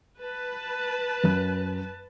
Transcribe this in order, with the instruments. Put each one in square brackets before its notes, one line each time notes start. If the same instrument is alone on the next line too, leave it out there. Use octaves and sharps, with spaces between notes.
[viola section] B4 A5
[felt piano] F#2 F#6